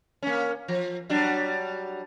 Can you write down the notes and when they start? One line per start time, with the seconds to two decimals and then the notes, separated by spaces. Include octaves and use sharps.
0.23 A#3 C#4
0.68 F3
1.09 F#3 G3 D4